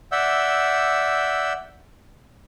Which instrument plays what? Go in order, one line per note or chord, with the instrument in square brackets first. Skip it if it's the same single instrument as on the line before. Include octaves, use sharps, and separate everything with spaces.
[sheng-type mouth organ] D5 E5 F#5 E6 G6